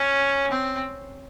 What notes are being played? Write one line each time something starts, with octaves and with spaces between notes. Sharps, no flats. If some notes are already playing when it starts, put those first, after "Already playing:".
Already playing: C#4
C4